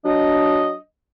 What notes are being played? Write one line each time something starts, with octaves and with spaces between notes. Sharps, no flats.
F#3 D4 D#5